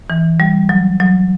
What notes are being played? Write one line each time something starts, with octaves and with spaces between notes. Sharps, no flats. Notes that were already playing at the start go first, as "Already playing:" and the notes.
E3
G3
F#3
F#3